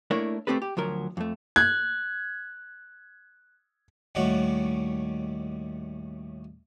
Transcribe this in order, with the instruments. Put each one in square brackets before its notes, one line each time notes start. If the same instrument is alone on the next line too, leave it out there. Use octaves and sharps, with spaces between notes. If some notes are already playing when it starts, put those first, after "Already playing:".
[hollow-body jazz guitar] A3 A#3 D4 E4 A#4 C#5
A3 C4 G4 A4 B4
G4
D2 F3 F#3 A#4
F2 A3
[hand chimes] F#6 [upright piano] G#6
[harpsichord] D#2 A2 G3 F#4 C#5